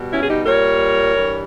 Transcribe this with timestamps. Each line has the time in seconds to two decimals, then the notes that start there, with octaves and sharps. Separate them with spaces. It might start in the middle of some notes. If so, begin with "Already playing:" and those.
Already playing: B2 G3
0.10 C#4 E4
0.20 G#4
0.28 D#4 G4
0.45 A#2 G3 A#4 C#5
1.15 G2 E3 G3